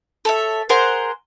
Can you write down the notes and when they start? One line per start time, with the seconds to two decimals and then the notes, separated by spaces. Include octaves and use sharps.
0.25 A4 C#5 E5
0.69 G#4 A#4 C5 F#5